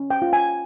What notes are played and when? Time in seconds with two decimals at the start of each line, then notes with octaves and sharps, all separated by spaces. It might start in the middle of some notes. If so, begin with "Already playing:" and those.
Already playing: C#4
0.11 G5
0.22 F4
0.33 G#5